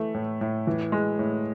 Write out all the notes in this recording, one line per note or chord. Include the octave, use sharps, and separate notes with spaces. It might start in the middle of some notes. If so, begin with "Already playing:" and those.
Already playing: E3 A3
A2
A2
E3
G#3
A2